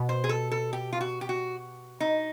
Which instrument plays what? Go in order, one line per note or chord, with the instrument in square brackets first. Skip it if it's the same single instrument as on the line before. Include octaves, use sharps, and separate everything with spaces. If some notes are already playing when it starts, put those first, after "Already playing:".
Already playing: [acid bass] B2
[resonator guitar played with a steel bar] C5
G#4
A4
A4
G4
F4
F#4
G4
F#4
D#4